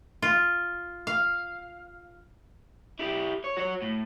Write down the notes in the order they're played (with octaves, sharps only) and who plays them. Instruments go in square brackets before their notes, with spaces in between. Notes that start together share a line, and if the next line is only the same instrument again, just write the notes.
[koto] F4
F5
[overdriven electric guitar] E4 G4
C#5
F#4 C#5
A2